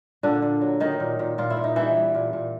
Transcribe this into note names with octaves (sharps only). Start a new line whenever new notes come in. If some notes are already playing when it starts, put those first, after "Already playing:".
A#2 D3 D4
A#2
F#3
D#3 F#3 D#4
A#2
A#2
A#2 F4
E4
A#2
D#4
E3 G3 E4
G3
A#2
A#2